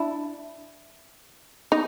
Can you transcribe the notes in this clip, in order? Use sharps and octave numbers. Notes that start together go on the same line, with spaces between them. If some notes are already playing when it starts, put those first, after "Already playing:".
Already playing: D4 E4
D#4